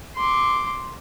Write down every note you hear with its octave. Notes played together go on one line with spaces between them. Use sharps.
C6 D6